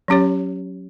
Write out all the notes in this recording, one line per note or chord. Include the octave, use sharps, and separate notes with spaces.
F#3 C#4 G4 C#5